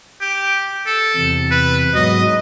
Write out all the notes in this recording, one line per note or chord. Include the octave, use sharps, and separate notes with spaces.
G4
A4
E2 C3
B4
G#2 F#3 B3 D#5